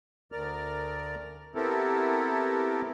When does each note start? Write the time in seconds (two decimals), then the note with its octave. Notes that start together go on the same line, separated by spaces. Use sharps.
0.32 D2 A#4 D5 F6
1.55 B3 C4 E4 G4 A4 A#4